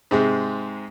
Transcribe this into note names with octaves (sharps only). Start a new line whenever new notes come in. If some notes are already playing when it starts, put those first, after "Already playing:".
G#2 C3 G#3